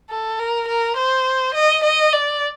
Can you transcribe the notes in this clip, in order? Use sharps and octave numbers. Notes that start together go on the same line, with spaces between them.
A4
A#4
A#4
C5
D#5
D#5
D5